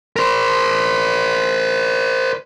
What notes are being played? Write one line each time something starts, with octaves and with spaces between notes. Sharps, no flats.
A#4 C5